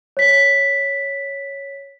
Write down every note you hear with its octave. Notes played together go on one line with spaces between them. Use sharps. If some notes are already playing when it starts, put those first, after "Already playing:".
C#5 B6